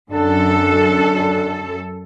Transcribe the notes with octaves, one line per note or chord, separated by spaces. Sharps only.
F#2 D3 D4 A4